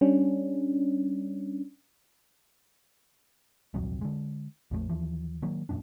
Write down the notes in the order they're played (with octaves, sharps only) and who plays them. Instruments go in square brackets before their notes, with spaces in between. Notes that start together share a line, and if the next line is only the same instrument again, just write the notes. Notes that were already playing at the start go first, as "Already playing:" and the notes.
[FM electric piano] G3 C#4 D4
[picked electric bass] D#1 C2 F2 F#3
D3 G#3
A#1 F2 G3 A3
D#2 E3 F3
D#3 F#3 A#3
E1 F#2 A#2 D4